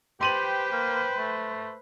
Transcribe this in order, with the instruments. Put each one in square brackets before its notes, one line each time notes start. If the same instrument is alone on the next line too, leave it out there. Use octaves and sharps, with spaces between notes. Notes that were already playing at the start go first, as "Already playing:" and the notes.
[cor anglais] G4 [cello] B4 C5 [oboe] G5 [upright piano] C6 D#7 F#7
[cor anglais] A#3
A3